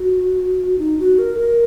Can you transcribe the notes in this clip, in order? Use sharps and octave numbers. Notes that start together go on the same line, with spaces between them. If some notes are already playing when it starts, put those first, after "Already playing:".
Already playing: F#4
D#4
F#4
A#4
A#4